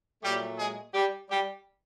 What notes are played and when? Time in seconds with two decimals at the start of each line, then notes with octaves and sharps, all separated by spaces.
0.23 A#2 F#3 G3 A3 G4
0.58 G#3 G#4
0.94 G3 G4
1.30 G3 G4